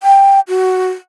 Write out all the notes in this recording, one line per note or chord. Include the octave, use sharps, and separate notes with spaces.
G5
F#4